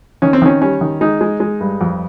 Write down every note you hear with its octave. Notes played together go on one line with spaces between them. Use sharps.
D#3 C#4
C4
D#3 C#4
G3 C#4
D#3
G#3 D#4
G#3
G#3
G2
F2